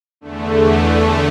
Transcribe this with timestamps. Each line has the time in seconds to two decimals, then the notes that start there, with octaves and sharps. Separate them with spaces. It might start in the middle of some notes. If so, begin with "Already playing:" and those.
0.21 E2 D3 A3